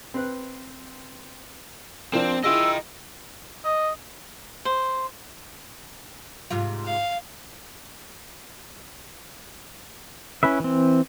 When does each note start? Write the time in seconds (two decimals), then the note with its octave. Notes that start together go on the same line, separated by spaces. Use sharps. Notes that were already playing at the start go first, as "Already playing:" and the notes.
0.14 C4 B4 F#6
2.13 F3 C4 D4 A#4 C5
2.44 E4 F4 G#4 D#5 G5 E6
3.65 D#5
4.65 C5
6.50 G#2 C3 F4
6.86 F5
10.43 C#4 E4 B4 E5
10.60 E3 C4